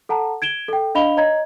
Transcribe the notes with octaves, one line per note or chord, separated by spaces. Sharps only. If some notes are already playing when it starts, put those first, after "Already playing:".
A4 F#5 A5 A#5
G#6 D7 E7 G7
A4 G5
D4 D#5 F5 B5 F7 G7
C#5 D#5 A#5 G#6